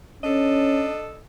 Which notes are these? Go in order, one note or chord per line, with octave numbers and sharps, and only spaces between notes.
C#4 D4 A4 D#5